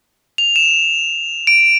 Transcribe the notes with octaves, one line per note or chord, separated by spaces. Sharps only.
F7
E7
D7